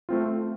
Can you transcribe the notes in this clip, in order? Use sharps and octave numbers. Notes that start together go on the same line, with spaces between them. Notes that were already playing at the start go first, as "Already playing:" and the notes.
A3 C4 F4